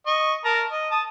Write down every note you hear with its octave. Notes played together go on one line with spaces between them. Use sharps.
D#5 C#6
A#4 A5 A#5
D#5
A5 D#6